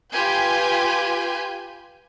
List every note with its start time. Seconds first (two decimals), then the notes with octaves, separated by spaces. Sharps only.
0.13 F4 G4 B4 G#5 G6